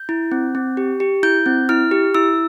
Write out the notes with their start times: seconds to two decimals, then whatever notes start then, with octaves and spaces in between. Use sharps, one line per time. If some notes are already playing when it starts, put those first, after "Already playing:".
Already playing: G6
0.09 E4
0.32 C4
0.55 C4
0.77 G4
1.00 G4
1.23 E4 G6
1.46 C4
1.69 E4 F6
1.91 G4
2.14 E4 E6